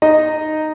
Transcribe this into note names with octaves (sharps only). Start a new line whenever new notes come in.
D#4 D#5